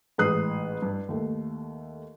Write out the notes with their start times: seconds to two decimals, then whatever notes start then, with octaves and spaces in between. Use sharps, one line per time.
0.18 A1 G#2 G#4 D#6 F#6 C7
0.82 G2
1.09 D#2 A3